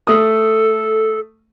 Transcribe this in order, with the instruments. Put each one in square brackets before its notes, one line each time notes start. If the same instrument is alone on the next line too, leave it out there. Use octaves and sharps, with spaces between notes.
[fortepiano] A3 D#6 [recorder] A4